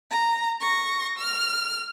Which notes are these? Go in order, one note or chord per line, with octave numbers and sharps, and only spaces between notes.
A#5
C#6 A#6
F6 F7